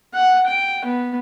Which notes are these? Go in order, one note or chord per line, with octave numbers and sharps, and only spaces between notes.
F#5
G5
B3